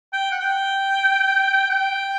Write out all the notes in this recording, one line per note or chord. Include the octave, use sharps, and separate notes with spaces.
G5
F#5
G5
G5